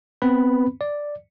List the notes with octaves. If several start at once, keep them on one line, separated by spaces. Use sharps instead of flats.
B3 C4 B4 B5
D5